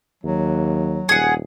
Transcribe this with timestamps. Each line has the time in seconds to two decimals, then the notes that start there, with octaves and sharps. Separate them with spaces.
0.24 D#2 F#3
1.09 D#1 G#4 F#5